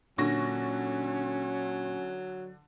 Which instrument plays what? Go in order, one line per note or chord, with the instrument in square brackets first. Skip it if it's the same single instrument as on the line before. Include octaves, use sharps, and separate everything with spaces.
[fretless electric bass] A#2 [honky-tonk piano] D3 C#6 A#6 [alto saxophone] F#3 [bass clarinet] C#4